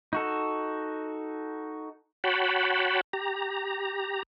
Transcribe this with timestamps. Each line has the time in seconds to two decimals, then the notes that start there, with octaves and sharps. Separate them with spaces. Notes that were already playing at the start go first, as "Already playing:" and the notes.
0.13 D#4 F#4 A4
2.24 F#4 C#5 F#5 G5 A5 B5
3.13 G4 A#5